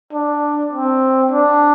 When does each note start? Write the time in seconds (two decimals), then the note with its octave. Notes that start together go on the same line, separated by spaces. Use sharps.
0.13 D4
0.73 C4
1.32 D4